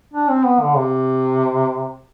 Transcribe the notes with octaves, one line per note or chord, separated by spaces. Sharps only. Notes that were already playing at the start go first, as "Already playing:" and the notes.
D4
C4
B3
D3
C3